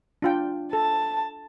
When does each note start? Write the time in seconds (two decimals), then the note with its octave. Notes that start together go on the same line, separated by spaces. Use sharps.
0.22 D4 F4 G5
0.73 A4 A5